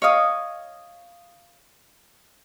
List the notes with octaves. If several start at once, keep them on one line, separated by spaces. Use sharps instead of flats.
C#5 D#5 F5 D#6